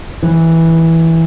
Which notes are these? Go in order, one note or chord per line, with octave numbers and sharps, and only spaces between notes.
E3